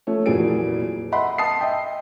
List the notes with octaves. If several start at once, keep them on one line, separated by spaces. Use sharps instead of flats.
F3 A3 C#5
F1 A#2 E3 F#3 G#4 D7
D#5 E5 F#5 B5 C6
A5 D#6 C7
D#5 E5 G5